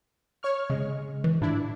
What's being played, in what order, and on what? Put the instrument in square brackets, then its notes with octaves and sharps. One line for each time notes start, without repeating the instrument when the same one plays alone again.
[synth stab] C#5 C#6 F6
[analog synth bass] C#3 [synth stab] G#3
[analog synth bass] E3
[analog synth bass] A2 [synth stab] D4 E4